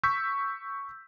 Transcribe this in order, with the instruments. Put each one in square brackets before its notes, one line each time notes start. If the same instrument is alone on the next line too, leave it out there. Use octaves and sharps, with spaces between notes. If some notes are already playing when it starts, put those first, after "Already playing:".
[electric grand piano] C#6 E6 G6 B6